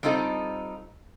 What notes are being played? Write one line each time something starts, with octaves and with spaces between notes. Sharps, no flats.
G3 C4 D#4 F4 A4 D#5